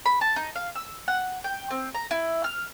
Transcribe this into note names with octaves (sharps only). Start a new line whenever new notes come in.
B5
A5
D#4
F5
E6
F#5
G5
C4
A#5
E4
F6